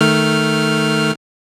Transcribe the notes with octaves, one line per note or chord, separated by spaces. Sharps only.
D#3 A3 F6